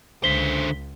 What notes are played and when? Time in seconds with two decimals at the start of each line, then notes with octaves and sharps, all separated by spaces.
0.24 C#2 D3 C5 B6 G7